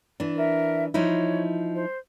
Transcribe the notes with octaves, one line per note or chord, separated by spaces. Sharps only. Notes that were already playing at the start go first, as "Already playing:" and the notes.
E3 D4
A#4 E5
F3 D#4 E4 C#5
C5